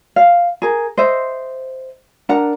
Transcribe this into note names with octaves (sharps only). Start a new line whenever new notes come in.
F5
G#4 A#4
C5 D#5 E5
D4 A#4 F#5 A#5